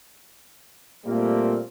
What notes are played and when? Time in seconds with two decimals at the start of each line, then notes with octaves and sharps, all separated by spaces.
1.05 A#2 G3 A3 A#3 C4